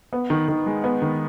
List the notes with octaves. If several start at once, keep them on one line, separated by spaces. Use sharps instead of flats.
B3
D#3
D#3
G#3
B3
D#3